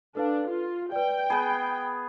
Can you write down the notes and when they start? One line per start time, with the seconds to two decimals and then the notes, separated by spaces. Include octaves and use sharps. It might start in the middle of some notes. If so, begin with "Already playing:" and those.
0.15 D4 A4 B4 F5
0.48 F4
0.92 B4 D5 G5
1.30 B3 G#4 B5